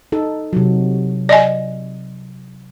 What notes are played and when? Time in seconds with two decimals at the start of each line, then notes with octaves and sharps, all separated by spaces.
0.12 D#4 A4
0.53 C3 F#3
1.29 D5 D#5 G#5